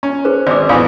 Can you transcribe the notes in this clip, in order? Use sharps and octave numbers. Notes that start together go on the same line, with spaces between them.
C#4
G#4 B4 C5
G#1 D5 D6
A1 E2 E3 F5 B5 D#6